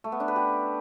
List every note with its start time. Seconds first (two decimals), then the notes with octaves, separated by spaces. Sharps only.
0.04 A3
0.12 B3
0.20 D4
0.28 B4
0.36 G4